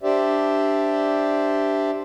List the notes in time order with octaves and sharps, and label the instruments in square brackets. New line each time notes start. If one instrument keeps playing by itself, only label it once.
[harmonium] D4 G4 C5 D5 E5